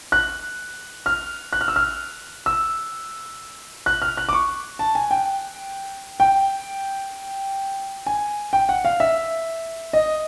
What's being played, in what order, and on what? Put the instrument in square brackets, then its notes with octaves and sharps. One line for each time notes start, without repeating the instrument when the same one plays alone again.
[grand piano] F#6
F6
F#6
F6
E6
F6
E6
F#6
F6
F#6
D6
C#6
A5
G#5
G5
G5
G#5
G5
F#5
F5
E5
D#5